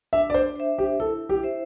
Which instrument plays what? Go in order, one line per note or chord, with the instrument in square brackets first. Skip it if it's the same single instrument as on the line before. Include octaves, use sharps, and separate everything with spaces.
[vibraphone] D4 [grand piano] E5
[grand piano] D5
C5
[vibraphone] C5 E5
[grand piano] G4
[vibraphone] E4 [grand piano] A4
[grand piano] G4
[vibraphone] C5 E5